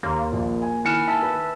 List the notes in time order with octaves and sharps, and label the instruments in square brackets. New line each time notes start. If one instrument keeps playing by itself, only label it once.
[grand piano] D#2 C6 [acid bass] A#3
[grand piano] A#1
G#5
[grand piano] D#3 C#7 E7 [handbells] E4 G#5 F6
[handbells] E5 A5 E6
[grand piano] B4